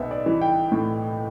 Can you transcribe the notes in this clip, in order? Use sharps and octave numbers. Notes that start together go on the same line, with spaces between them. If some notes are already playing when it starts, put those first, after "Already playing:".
Already playing: B1 B3 E5
D5
E3
G5
A2